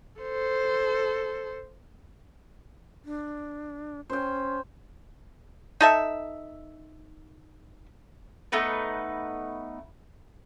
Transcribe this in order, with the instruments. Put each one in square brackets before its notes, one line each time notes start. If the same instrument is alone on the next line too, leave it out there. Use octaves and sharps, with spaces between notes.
[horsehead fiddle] A4 C5
[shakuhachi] D4
[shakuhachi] C#4 [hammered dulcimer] C5 G5
[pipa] D#4 A4 E5
[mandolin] A3 B3 D#4 B4